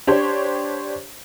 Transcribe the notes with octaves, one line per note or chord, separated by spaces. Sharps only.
D4 G4 C5 C#5